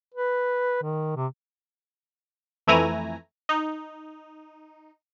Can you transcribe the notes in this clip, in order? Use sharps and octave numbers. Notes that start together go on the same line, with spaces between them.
B4
D#3
C3
F2 E3 A3 E4 G#5 A#5
D#4